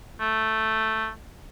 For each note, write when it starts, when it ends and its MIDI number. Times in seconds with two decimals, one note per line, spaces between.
0.20 1.10 57